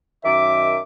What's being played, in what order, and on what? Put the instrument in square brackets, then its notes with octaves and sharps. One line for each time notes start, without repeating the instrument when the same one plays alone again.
[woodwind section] F#2 D#3 D6 [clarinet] E5